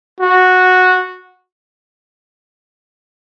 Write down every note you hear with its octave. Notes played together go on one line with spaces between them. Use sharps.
F#4